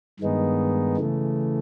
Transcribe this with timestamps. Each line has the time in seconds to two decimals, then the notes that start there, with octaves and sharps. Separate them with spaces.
0.20 G2 D#3 G#3 B3 D#4
0.98 C#3 E3 A3